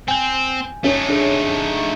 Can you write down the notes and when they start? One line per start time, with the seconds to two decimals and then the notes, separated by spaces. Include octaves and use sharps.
0.08 C4 G#5 G6
0.84 A3 C#4 D#4
1.09 D4 G#4 A4